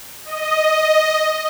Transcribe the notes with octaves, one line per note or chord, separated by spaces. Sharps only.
D#5